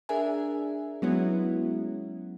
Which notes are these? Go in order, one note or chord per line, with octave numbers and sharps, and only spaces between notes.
D4 G#4 A#4 E5 G#5
F#3 G#3 B3 C#4 E4 F#4